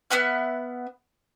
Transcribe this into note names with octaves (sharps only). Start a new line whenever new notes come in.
B3 E5 F#5 F6